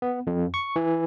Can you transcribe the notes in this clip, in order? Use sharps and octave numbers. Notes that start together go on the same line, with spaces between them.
B3
F2
C#6
E3